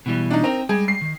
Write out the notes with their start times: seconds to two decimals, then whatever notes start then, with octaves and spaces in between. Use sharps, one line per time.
0.06 B2 E3 G3
0.30 D4 D#4
0.44 C4 D#4 A#4
0.69 G3 G#3 G#4
0.88 C7
1.01 D#3